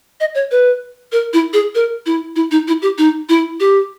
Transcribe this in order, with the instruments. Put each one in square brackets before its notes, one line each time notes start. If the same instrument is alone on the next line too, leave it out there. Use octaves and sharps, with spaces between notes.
[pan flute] D#5
C#5
B4
A#4
E4
G#4
A#4
E4
E4
D#4
E4
G4
D#4
E4
G4